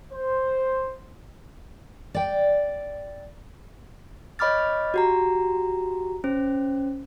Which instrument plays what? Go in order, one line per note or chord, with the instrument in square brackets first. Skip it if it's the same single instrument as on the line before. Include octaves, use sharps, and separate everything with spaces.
[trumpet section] C5
[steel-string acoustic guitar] D5 G5
[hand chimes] C#5 D#5 B5 D6 F6 A6
F#4 G4 A#5
C#4 C5